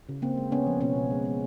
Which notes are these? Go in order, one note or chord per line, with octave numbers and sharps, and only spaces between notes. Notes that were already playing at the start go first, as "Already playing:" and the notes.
C#3
C#3 A#3 C4
G#3
C#3 B3 C#4
F3
B2 B3 C#4
B2
G#3
G#3